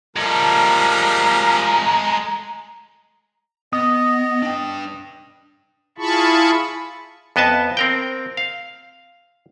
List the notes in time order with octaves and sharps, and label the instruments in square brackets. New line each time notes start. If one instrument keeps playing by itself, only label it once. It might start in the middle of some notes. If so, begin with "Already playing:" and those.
[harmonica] F3 G3 A#4 [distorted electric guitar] G#3 A4 [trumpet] A#5
[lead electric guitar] B3 [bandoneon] D#5 [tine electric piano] D#6
[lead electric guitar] D4 G5
[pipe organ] E4 F4 G#4 A5 B5 C#6
[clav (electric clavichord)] F2 B3 D#5 E5 A5
C4 A#4 G5
F5